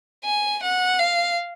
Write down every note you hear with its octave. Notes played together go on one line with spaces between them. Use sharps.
G#5
F#5
F5